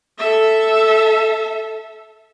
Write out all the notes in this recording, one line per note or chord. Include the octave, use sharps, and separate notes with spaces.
A4 E5